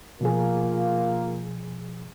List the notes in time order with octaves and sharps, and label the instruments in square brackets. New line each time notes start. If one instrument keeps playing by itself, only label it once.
[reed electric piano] B2 F3 G#4 [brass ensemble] A#3 F4